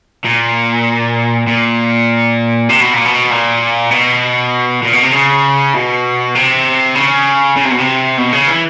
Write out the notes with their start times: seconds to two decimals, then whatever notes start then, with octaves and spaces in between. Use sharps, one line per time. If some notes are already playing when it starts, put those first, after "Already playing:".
0.25 A#2
1.47 A#2
2.69 C3
2.81 B2
2.94 A#2
3.05 B2
3.31 A#2
3.91 B2
4.83 A#2
4.93 B2
5.03 C3
5.13 C#3
5.74 B2
6.35 C3
6.95 C#3
7.56 C#3
7.65 C3
7.71 B2
7.78 C3
8.17 B2
8.32 C#3
8.48 E3